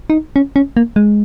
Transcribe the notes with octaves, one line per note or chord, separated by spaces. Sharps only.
D#4
C#4
C#4
A#3
G#3